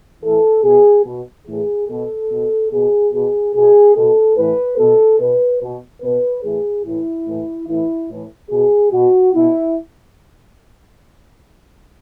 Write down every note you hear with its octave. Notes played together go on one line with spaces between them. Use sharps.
A2 E3 A4
B2 G#4
B2
A2 E3 G#4
B2 A4
B2
B2 G#4
B2 G#4
B2 G#4
B2 A4
A2 E3 B4
B2 A4
B2 B4
B2
B2 B4
A2 E3 G#4
A2 E3 E4
A2 E3
A2 E3 E4
A2 E3
B2 G#4
B2 F#4
B2 E4